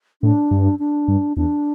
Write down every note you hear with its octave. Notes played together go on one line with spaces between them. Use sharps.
A2 D4
G2
D4
G2
E2 D4